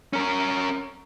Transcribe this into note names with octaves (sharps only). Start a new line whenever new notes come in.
C#4 A#4